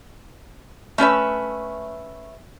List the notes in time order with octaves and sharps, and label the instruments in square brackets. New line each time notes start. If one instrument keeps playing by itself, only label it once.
[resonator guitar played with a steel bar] A3 C#4 B4 E5